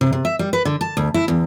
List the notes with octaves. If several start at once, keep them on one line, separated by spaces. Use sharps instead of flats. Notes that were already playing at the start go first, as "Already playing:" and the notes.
C3
C3
E5
G3
B4
D3
A5
D2
E4
E2